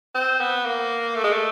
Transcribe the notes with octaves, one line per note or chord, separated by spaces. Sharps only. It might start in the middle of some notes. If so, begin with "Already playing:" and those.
C4
B3
A#3
A3
G#3
A3